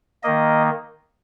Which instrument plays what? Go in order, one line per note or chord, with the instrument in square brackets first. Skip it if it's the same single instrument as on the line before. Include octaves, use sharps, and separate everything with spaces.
[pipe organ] D#3 A#3 D#5